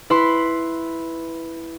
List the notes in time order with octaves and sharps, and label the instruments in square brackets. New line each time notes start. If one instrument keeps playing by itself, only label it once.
[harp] E4 B4 B5 C6